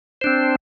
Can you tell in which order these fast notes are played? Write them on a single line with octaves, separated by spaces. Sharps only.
C5 D4 C4